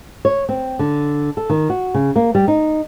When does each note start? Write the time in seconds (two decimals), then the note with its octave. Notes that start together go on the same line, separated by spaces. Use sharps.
0.25 C#5
0.49 C4
0.79 D3
1.37 A4
1.50 D#3
1.70 F#4
1.94 C#3
2.16 A#3
2.35 G3
2.48 D#4